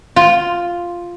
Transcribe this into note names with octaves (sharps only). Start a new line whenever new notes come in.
F4